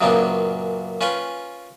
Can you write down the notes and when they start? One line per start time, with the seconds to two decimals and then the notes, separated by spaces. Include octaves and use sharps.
0.01 F#2 A#2 C#3 B3 C4 D4
1.01 C#4 F4 B4 G5 G#5